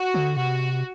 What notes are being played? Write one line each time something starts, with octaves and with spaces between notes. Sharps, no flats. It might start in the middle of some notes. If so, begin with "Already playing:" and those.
Already playing: F#4
D3
C3 F#4